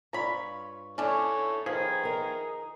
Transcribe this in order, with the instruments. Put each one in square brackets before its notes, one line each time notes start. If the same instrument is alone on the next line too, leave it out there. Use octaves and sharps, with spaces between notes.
[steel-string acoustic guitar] G2 F4 C#5 [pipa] A#5 B5
[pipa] C#4 D4 [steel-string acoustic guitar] E4 [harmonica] A4 C#5
[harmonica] D#3 [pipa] F3 [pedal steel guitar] G#4 [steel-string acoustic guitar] B4
[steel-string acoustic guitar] D#4 A#4